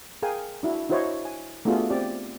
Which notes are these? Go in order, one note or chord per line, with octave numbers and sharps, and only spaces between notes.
G#4 A#4 F5 G5 G#5
D4 E4 F#4
D4 E4 F#4 C5 C#5 D#5
G#5
A3 B3 D4 F4 F#4 G#4
C4 G4 D5